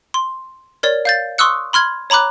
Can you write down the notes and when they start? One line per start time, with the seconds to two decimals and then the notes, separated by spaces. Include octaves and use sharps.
0.14 C6
0.83 A#4 C#5 D5
1.05 F5 G6 A6
1.38 C6 C#6 D#6 E6 F#6 C#7
1.73 B5 C6 F6 G#6
2.10 C#5 A#5 B5 D6 F#6